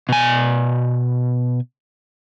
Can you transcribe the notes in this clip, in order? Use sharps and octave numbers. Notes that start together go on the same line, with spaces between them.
B2 G#5